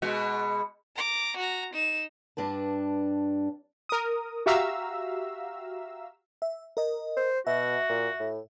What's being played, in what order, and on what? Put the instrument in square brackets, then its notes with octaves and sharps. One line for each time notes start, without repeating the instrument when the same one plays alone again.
[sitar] B2 G#3 F#4
[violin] A#5 D6
F#4 A#5
D#4 E7
[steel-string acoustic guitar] G2 D4 B4 A5
[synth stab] A#4 D#6
F#4 G4 E5 F5 A#5 E6
[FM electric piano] E5
A#4 D#5
[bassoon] C5
[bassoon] B2 [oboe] F#4 [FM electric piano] E5
[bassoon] A#2
A2